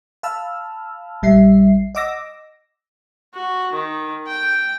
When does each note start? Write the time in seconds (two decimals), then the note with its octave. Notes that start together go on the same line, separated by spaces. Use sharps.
0.23 F5 A5 B5 E6 F6
1.22 A#1 G3 E5 C7
1.95 D#5 F#5 D6 E6 A#6
3.34 F#4
3.74 D#3
4.27 G5